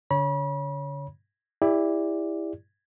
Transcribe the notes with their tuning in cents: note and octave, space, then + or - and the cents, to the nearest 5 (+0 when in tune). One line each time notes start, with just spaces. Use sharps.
D3 -40 C#5 +5 B5 -35
E4 +0 G4 +40 D5 +0